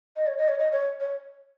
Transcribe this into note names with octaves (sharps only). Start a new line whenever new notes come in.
D#5
C#5
D#5
C#5
D#5
C#5
C#5